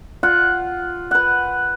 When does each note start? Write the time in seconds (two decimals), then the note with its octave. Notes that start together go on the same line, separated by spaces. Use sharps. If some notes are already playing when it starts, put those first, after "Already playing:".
0.23 F4 F#5
1.11 B4 F#5